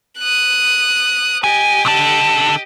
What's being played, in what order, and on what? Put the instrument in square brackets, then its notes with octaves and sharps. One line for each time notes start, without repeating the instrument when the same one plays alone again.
[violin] D#6 F#6
[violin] G4 D#5 [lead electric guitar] G#5
[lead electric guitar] D3 A5